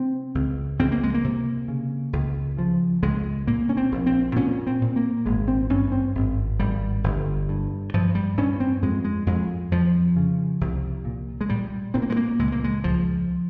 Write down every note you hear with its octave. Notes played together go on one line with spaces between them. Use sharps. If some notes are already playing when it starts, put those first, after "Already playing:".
Already playing: C3 C4
C#2
C#2 C4
A#3
G#3
A#3
C3
C#3
C#2
C#3 F3
C#2 G#3
A#2 A#3
C#4
C4
A#1
C4
A#2 C#4
C4
A#2
A#3
G#1 G#3
C4
G2 C#4
C4
G#1
G#1 G3
G1
G2
G2 F3
G3
G2 C#4
C4
F2 G#3
G#3
F2 G#3
F2 F3
C#3
C2
A#2
G#3
A#2 G3
A#2 C4
A#3
G#3
A#3
C#2 G#3
A#3
G#3
C#2 F3